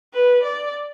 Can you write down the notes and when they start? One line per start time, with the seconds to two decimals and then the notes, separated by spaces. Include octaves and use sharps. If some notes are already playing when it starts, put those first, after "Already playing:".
0.14 B4
0.44 D5